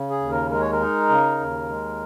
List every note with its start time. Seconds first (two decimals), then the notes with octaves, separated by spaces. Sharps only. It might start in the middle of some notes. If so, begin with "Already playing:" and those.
Already playing: C#3
0.10 G#4
0.21 D#2
0.31 A#4
0.50 G#3 A#4
0.60 C#5
0.72 A#4
0.80 D#4
1.09 C#3
1.40 D#2
1.68 G#3